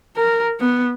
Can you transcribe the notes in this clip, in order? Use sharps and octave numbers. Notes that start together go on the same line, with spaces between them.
A#4
B3